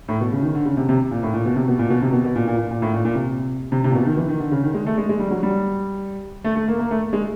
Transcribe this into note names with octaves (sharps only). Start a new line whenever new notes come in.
A2
B2
C#3
D#3
D3
C#3
C3
C3
A#2
A2
A#2
B2
C3
B2
A#2
B2
C3
B2
B2
A#2
A#2
A#2
A#2
A2
A#2
A#2
C3
C3
C3
A#2
B2
D#3
E3
D#3
D3
C#3
D#3
G#3
A3
G#3
G#3
G3
F#3
G3
A3
A3
A#3
A#3
A3
G#3